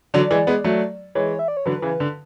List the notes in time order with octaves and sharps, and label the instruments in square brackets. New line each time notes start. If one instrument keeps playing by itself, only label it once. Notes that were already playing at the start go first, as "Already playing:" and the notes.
[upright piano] D3 F#3 [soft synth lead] D5
[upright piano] E3 G#3
G#3 B3
F#3 A3
[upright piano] E3 G#3 [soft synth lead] C#5
[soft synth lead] E5
D5
C#5
[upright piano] D3 F#3 [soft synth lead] B4
[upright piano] C#3 E3
D3